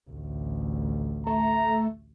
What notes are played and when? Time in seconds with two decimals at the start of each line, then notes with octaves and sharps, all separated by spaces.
0.10 A1 D2
1.27 A3 A#5